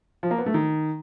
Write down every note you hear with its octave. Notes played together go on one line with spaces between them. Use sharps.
F3
A#3
B3
A3
D#3